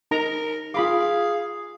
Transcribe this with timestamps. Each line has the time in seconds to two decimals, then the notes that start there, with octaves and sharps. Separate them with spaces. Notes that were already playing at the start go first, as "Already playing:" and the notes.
0.11 D#4 A#4 A#5
0.74 F4 G#4 F5 B5 D6